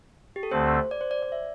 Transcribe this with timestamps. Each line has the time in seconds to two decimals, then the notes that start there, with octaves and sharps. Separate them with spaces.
0.36 G4
0.43 A4
0.51 D2 D3 A3 C4 C5
0.91 D5
1.01 C5
1.11 D5
1.23 D5
1.32 E5